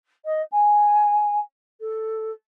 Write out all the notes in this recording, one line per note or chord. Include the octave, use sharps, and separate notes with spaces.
D#5
G#5
A4